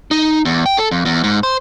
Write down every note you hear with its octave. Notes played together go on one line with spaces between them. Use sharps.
D#4
E2
G5
A4
F2
E2
G#2
C5